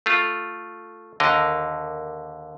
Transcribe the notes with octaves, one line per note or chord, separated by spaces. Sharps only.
A3 F4
D#2 D3 A#4 D#5